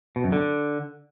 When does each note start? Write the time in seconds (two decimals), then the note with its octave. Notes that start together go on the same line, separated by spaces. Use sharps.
0.16 B2
0.24 F#2
0.32 D3